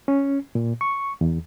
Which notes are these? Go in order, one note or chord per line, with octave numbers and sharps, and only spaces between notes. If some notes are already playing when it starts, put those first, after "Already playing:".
C#4
A#2
C#6
E2